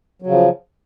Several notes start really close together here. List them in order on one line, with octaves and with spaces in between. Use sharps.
F#3 C#3 F3